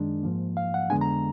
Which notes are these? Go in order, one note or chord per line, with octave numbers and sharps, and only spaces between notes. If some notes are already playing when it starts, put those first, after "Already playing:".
Already playing: F#2 D#3 G#3 D4
G#2 F3 A#3
F5
F#5
F2 D3 G#3 B3 D4 G#5
A#5